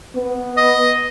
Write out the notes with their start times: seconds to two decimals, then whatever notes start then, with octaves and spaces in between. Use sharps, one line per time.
0.16 B3
0.57 D#5